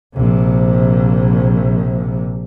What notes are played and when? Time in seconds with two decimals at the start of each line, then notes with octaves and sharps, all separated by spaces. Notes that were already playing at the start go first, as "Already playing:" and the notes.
0.15 A#1 C3